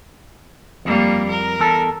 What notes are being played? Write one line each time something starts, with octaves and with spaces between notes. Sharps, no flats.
F2 G3 A#3
A#4
E2 A4